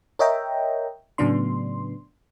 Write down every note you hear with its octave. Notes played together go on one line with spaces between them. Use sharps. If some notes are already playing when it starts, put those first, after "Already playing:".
A#4 C#5 D#5 E5 G5 A#5
A2 C#3 F#3 B3 D4 C6